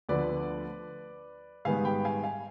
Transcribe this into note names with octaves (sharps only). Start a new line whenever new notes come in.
D2 D3 F3 B3 B4 D5
G#2 D#3 G3 B3 F5 G#5
G5 B5
F5 G#5
F5 G#5